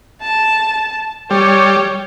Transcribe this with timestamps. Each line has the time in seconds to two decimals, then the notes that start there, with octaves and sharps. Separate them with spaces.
0.22 A5
1.30 G3 C#5